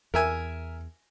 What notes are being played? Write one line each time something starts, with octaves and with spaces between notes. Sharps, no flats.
E2 A#4 E5 G#5